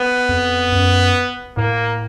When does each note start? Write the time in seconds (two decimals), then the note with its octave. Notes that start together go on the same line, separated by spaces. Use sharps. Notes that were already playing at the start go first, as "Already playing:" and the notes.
Already playing: B3
0.29 F2
0.72 F#2
1.57 A2 A#3